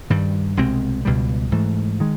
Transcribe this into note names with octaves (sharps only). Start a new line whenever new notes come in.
G2 D#3 G3
C2 B2 G#3 C4
C#2 B2 G3
G#2 E3 A3
D#3 G#3